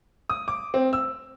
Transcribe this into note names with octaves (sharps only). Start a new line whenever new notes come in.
D#6
D6
C4
E6